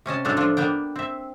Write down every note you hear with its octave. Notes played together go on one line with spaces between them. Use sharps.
C3 C#4 D#5 A5
A2 F#3 G#3 D4 D#4 A4
F3 D4 F4
A#3 B3 D4 G5
C4 E5